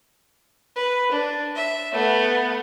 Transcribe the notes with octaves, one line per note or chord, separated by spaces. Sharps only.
B4
D4
E5
A3 B3